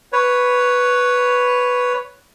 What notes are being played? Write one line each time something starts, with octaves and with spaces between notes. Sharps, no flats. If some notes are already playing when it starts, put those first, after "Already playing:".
B4 C#5